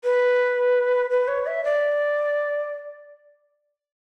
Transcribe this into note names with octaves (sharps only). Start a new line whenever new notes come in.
B4
B4
C#5
E5
D5